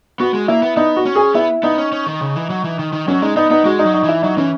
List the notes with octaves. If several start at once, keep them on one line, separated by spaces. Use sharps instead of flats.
B3 F#4
G#3
A#3 E4
B3
B3 D#4
F#4
C#4
G#4
B3 E4
B3 D#4
C#4
C#4
D#3
C#3
E3
F#3
E3
D#3
D#3
F#3 C#4
G#3 D#4
B3 D#4
B3 D#4
G#3 F#4
D#4
F#3
D#4
E3
E4
F#3 D#4
E3 C#4